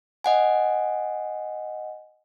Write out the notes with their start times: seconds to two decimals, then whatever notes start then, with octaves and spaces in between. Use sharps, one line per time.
0.24 D#5 F#5 G#5